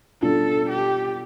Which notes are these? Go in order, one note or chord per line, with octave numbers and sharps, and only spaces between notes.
B2 G3 D4 F4 A4
G4